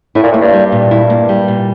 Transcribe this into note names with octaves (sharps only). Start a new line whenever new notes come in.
A2 E4
A#2
A2 A#3
G2
G3
G2
A#2
E4
A#3
G3
A#2